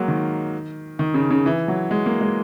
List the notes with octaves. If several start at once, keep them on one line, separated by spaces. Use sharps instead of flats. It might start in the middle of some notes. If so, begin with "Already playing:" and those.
Already playing: F#3 G#3 A#3
D#3
D#3
C#3
C#3
E3
F#3
G#3
A#3
G#3